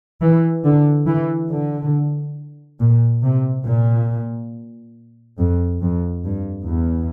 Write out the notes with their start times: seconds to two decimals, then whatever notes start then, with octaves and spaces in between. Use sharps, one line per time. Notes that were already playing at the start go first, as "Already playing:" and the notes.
0.21 E3
0.64 D3
1.07 E3
1.51 D3
2.80 A#2
3.23 C3
3.66 A#2
5.38 F2
5.81 F2
6.25 G2
6.67 E2